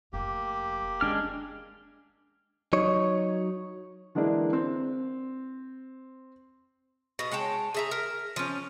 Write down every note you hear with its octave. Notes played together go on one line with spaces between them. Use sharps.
F1 F2 A#3 G4
G#3 C#4 D4 F6
F#3 D#4 C#5
D3 E3 G#3 A#3 D4 E4
C4
B2 D#5
G#3 C#5 G5 A5
G#4 E5 A#5
A#4
F3 C#4